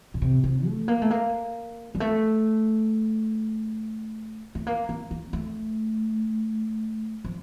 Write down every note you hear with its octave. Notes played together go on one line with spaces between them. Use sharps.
A#2
C3
C3
A3
A#3
A3
A#3
G3
A3
A3
A#3
A#3
A#3
A3
F3